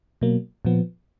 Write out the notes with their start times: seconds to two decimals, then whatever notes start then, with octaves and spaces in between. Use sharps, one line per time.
0.21 B2 F#3 A#3
0.65 A#2 F3 B3